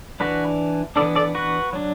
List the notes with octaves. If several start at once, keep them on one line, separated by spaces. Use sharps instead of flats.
E3 D4 F#4 B4
E3 B3 D4 A4 D5
A4 D5
F#4 B4
F#3 D4